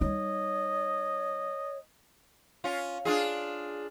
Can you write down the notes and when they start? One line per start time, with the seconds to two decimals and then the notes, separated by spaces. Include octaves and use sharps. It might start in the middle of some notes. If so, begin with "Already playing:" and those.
0.01 G3 D#4 C#5 D#5
2.64 C#4 F4
3.05 D4 F4 G#4